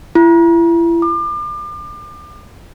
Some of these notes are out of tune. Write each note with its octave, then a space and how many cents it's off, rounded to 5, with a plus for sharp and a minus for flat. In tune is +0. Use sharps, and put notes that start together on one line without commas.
E4 +35
D6 +35